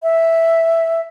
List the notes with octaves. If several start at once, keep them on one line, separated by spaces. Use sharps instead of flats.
E5